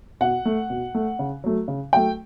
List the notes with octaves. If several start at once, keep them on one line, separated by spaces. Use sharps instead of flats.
B2 F#5
A3
B2
A3
C#3
F#3 A3
C#3
F#3 A3 G5